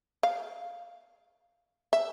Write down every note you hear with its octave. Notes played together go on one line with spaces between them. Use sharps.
F5
E5